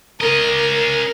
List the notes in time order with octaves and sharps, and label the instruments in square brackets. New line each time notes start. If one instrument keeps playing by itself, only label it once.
[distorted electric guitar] C#4 D#5 [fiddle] A#4